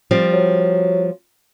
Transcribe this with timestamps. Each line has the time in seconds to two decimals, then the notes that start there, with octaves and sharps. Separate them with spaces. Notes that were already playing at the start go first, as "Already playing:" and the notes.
0.11 F3 G3 C4
0.33 F#3